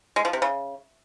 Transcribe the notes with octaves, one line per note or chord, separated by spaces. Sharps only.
G#3
F3
C3
C#3